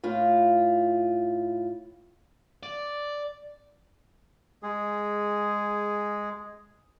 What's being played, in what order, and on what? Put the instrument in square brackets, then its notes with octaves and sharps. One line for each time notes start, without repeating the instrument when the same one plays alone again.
[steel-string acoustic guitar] A2 F4
[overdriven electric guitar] D5
[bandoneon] G#3 G#4